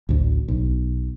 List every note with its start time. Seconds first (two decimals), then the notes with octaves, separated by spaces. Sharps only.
0.09 A1 D2
0.48 B1